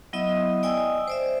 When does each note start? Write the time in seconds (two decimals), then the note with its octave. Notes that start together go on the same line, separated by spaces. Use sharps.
0.13 F#3 B3 E4 D#5 E5 D#6
0.63 D5 D#5 G5 G#5 D#6 E6
1.08 C5 D5 E5